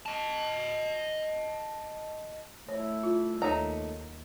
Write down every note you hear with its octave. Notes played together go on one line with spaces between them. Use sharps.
D#5 A5
A3 E4 C#5
F4
D#2 A3 D#4 C#5 A#5